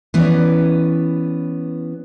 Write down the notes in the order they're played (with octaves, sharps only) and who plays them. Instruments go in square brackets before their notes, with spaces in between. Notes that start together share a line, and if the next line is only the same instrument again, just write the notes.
[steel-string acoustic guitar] E3 B3 C#4 D5